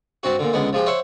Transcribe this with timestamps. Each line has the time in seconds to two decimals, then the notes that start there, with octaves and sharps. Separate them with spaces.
0.23 G2 C4 F#4
0.39 A#2 D3
0.53 C#2 D3 G#3 B3
0.73 F3 G#3 G4
0.86 C5 C#5 E5 F#5